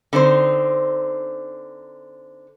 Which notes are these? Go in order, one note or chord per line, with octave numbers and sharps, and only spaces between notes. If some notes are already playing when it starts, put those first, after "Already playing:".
D3 C4 D#4 C5